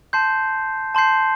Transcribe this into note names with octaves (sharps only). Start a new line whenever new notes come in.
A5 C6 G6 C7
A5 C6 G6 C7